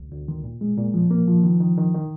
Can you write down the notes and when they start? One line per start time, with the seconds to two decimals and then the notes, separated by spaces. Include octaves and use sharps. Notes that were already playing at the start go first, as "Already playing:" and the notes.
Already playing: D2
0.12 D2
0.28 D#3
0.44 A#2
0.61 G#3
0.78 A#2
0.94 F3
1.11 A#3
1.28 F3
1.44 D#3
1.60 D#3
1.78 D#3
1.94 D#3